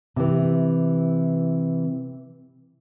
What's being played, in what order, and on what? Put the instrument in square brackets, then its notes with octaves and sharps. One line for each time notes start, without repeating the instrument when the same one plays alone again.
[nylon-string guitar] C3 E3